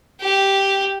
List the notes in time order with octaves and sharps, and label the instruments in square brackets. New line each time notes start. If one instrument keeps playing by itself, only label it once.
[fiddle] G4